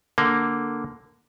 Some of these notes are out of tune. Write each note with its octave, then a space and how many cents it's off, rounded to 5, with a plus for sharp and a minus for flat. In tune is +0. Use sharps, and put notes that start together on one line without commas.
D3 +0 A#3 +0